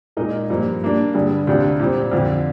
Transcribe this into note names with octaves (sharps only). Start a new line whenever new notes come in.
A#2 G#3 D#4 A#4 D#5
G2 F3 A#3 F4
G3 A#3 D4
G2 D3 G3 D4 G#4
D2 C3 G3 D4 F4
A#2 G3 C4
F2 D3 F3